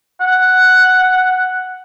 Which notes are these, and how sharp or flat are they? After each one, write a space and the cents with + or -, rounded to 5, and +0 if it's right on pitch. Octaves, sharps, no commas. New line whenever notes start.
F#5 +0